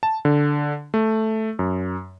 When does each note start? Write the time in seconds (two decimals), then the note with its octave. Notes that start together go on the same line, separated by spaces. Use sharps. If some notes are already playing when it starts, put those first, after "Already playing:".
0.03 A5
0.25 D3
0.94 A3
1.59 F#2